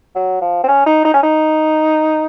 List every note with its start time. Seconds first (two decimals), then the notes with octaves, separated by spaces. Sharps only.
0.16 F#3
0.41 F3
0.64 C4
0.68 C#4
0.86 D#4
1.05 D#4
1.14 C#4
1.23 D#4